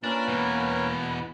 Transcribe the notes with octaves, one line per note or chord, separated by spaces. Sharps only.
A#2 A#3 C#4 D4 A#4 B4
B2 E3 B3